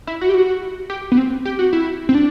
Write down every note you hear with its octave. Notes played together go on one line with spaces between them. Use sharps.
E4
F#4
G4
F#4
G4
B3
C4
G4
F#4
E4
C4
D4